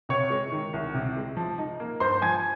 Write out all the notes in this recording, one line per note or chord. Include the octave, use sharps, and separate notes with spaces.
C3 C#5 C#6
G#3
D#3
C2
C3
G#3
F3
D#4
A#3
G2 C5 C6
F3 G#5 G#6